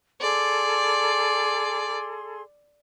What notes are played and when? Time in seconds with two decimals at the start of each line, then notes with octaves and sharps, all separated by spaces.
0.21 G#4 A4 D5 C6